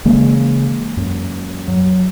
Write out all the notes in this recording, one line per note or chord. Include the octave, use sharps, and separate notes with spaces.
C#3 E3 G#3 A#3
F#2
F#3